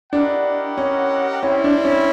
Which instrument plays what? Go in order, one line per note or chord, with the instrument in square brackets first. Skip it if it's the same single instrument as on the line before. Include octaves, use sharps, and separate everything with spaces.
[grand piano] D4 [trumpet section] E4 G4 A#4 D#5 F#5
[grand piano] C#4
[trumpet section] G3 C4 E4 [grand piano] C#4
[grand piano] D4
C#4